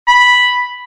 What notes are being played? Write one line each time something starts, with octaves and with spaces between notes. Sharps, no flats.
B5